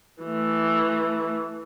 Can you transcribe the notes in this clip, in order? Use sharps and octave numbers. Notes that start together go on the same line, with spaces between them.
E3 A3